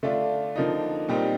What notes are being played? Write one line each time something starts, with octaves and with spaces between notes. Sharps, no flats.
D3 A3 D4 F4
D3 F3 A#3 D#4
A#2 G3 C4 D#4